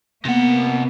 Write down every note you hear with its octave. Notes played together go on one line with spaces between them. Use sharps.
C3 A#3 B3 F#5